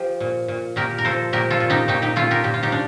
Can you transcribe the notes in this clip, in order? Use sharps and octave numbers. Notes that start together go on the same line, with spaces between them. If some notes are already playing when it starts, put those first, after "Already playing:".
Already playing: F3 G4
A#2
A#2
A#2 G4 A#4
A#4
F3 A4 C5
A#2 G4 A#4
F4 A4
A#2
D#4 G4
A#2 D#4 G4
D#4 G4
A#2 F4 A4
G4 A#4
A#2 G4
F4
D#4 G4
D4